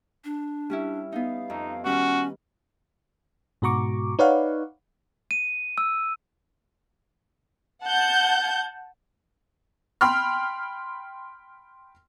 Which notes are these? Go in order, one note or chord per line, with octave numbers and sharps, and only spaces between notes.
D4
G3 C#4 E4
B3 D#4 F5
F2 D#4
D#3 G3 C#4 F#4
G#2 B2 F#4 A#5 C#6 D6
D#4 B4 C#5 D5 F5 F#5
D#7
E6
F#5 A5 G6
G5 B5 C6 F6